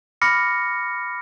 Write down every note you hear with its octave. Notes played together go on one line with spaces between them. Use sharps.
B5 D6 F6 A#6 C#7